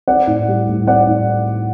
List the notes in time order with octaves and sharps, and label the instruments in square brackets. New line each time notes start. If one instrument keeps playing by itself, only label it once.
[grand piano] C4 D5 F#5
A2
G3
A2
C4 D5 F#5
A2